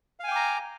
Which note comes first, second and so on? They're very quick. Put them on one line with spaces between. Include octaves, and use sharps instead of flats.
F5 G#5 G5 D6 A#5